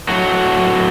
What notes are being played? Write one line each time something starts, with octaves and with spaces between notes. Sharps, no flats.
A2 F#3 F#4